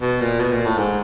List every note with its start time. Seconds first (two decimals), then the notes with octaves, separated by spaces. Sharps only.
0.01 B2
0.21 A#2
0.40 B2
0.52 A#2
0.65 A2
0.78 G#2